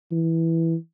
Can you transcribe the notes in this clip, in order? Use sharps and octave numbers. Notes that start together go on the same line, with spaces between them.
E3